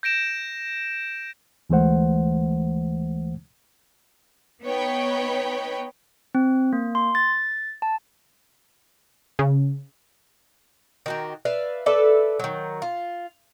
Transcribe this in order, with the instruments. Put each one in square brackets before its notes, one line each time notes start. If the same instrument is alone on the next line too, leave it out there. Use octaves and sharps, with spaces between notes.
[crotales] G6 A#6 D7 E7
[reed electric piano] D2 E3 G#3 A3 C5 F#5
[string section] B3 D#4 B4 C#5 G5 B5
[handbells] C4
A#3
C6
A6
A5
[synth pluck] C#3
[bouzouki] D#3 F#4 G4
B4 D5 E5 F5
A4 B4 D5 E5
D#3 F#3
F4